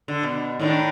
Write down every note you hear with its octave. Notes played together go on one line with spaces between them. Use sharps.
D3
B2
A2 D#3 D4